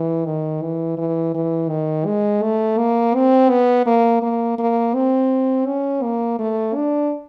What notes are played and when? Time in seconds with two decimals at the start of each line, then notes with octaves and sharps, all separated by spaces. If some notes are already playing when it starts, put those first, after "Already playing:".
Already playing: E3
0.26 D#3
0.62 E3
0.98 E3
1.34 E3
1.69 D#3
2.05 G#3
2.43 A3
2.78 A#3
3.15 C4
3.50 B3
3.86 A#3
4.22 A#3
4.58 A#3
4.95 C4
5.67 C#4
6.03 A#3
6.39 A3
6.75 D4